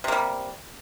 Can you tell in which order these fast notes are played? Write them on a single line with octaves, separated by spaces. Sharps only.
C3 A#3 G3